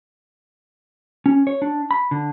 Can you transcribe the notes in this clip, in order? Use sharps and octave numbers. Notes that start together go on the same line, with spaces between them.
C#4
C#5
D4
B5
D3